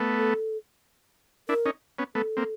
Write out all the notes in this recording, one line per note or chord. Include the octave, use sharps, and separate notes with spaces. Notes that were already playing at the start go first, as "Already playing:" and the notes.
Already playing: A3 B3
A4
D4 E4 A#4
C#4 D#4
B3 C#4
A3 B3 A4
A#3 C4